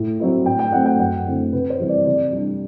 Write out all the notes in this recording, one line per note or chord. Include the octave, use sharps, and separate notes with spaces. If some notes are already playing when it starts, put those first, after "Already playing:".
Already playing: A2
F#3 C4 E4
A2 G5
G5
F#3 A3 C4 F#5
G5
F#2 F#5
D3 A3 C4 E4
C3 B4
C5
E3 G3 C4 E4
D5
C3 D5
G3 D4